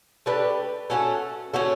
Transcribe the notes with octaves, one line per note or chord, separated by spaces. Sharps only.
A3 D4 G4 B4
A3 C#4 F#4 A4
A3 C#4 F#4 A4